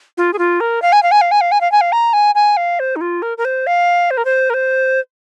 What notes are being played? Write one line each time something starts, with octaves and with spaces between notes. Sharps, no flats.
F4
G#4
F4
A#4
F5
G#5
F5
G#5
F5
G#5
F5
G#5
F5
G#5
F5
A#5
G#5
G#5
F5
C5
D#4
F4
A#4
A#4
C5
F5
C5
A#4
C5
A#4
C5